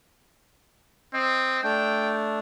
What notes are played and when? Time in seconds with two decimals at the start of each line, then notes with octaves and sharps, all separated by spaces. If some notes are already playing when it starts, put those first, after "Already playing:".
1.14 C4 D#5
1.63 A3 D4 G5